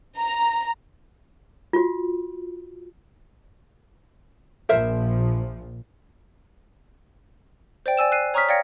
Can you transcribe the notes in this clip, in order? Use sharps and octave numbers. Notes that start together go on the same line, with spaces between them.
A#5
F4 F#4
A#1 A#2 F3 A#4 C5 E5
C5 D5 G5
D5 G#5 E6 E7
F#6 C7 D#7
C#5 A#5 C#6 D#6 F6 B6
D5 F5 G5 G#6 A#6 C#7